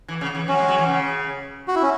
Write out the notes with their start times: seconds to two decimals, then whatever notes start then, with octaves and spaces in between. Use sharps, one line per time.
0.08 E3
0.21 C#3
0.35 E3
0.48 F#3 C#4
0.58 G#3
0.68 F#3
0.78 E3
0.88 C#3
1.68 F#4
1.76 E4
1.83 C#4